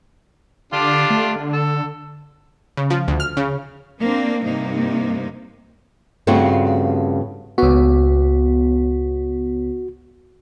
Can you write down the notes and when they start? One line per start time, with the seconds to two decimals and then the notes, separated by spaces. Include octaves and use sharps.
0.73 D3 D4 F4 G4
1.10 A3
1.36 D3
1.52 A4
2.77 C#3
2.90 F3
3.08 D2
3.20 F6
3.37 C#3
4.01 A#3 C4 D4
4.44 G2 C3 A#3 D#4
6.27 G2 C#3 A3 C4 F4 F#4
7.58 C#2 B3 F#4